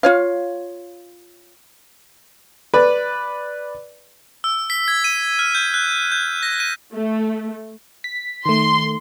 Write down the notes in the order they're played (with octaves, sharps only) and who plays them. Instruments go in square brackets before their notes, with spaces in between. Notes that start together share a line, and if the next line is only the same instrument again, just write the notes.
[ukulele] F4 C#5 F5
[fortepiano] B4 D5
[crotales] E6
B6
G#6
D#7
F6
G6
F#6
G6
A#6
D#7
[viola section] A3
[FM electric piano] B6
[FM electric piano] D#3 A3 [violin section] C6